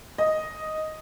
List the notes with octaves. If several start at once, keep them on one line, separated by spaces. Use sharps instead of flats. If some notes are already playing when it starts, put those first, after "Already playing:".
D#5